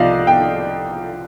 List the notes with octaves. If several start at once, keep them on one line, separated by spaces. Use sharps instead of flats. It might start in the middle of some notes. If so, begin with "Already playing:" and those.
Already playing: C2 F3 D5 D#5 F5
G5